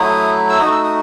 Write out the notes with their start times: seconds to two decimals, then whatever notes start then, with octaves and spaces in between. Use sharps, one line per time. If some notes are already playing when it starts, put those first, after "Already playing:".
Already playing: F#3 A3 E4 D#6
0.50 E6
0.59 A3 D#4 F#4 D#6
0.72 E6
0.84 D#6